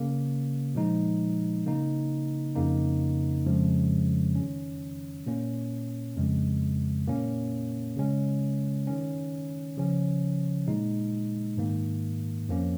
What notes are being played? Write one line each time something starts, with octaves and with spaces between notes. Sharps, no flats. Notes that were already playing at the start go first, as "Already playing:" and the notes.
Already playing: C#3 A#3 C#4
A#2 F3 G#3 D#4
C#3 A#3 D#4
F2 C#3 A#3 D#4
F2 C#3 F3 G#3
D#3 C#4
A#2 A#3 C#4
F2 C#3 G#3
A#2 A#3 C#4
C#3 G#3 C#4
D#3 C#4
C#3 F3 C#4
A#2 G#3 D#4
G#2 D#3 A#3
F2 F3 A#3 C#4